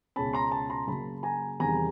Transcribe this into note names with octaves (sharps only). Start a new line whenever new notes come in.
C#2 B2 G#3 C#4 A5 B5
A#5 C6
A5 B5
A#5 C6
F#2 C#3 F#3 A#3 A5 B5
G#5 A#5
E2 C3 D#3 G3 G#5 A#5